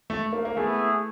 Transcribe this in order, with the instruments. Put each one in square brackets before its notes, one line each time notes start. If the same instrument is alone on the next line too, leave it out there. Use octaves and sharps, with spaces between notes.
[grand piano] A3
A#3
A#3
[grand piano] A3 [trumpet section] B3 E4 G#4